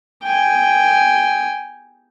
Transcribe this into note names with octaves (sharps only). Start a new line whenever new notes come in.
G5 G#5